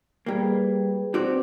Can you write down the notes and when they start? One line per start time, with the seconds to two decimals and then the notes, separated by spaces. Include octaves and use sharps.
0.26 G3 A#3 G#4 B4 G5
1.14 C4 F#4 G4 B4 C5 D5